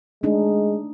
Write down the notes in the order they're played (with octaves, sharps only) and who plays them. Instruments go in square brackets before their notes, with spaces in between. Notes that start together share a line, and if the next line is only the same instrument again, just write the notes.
[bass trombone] G#3 [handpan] A3 D4 D#4